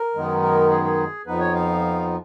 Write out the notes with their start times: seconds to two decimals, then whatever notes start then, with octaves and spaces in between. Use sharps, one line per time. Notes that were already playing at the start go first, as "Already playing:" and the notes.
Already playing: A#4
0.15 F#2 D#3 G#3 B3 D#4
0.42 A#4
0.70 G#4
0.84 G#4
1.26 F2 F3 B3 D#4 B4
1.40 C#5
1.55 F5